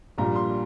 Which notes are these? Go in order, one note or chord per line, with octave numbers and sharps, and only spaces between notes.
A#1 A#2 G3 A#5
C6